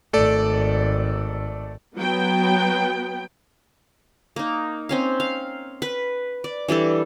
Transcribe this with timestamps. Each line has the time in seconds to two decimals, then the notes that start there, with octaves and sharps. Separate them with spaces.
0.13 G#1 A3 A4 D5
1.95 F#3 B3 G5
4.36 A#3 D#4
4.89 C4 C#4 F5
5.20 F5
5.82 B4
6.44 D5
6.68 E3 G3 D4 A4